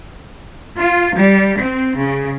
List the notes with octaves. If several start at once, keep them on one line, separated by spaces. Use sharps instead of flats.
F4
G3
C4
C#3